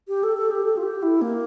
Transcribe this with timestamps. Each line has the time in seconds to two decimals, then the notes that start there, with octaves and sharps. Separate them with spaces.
0.08 G4
0.23 A4
0.37 A4
0.51 G4
0.65 A4
0.77 F4
0.83 G4
1.03 E4
1.22 A#3